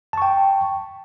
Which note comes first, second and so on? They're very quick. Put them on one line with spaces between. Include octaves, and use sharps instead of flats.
A5 C#6 G5